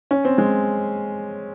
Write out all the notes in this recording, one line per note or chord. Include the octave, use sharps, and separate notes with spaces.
C#4
C4
G#3